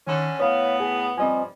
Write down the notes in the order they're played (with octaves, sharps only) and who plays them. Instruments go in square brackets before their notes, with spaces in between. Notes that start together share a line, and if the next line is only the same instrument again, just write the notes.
[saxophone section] D3 C#4 [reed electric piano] D#3
[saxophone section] A2 B3 [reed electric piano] C#5 F5
[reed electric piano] G#4
[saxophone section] G2 F3 G3 [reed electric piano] C4 D#5 G#5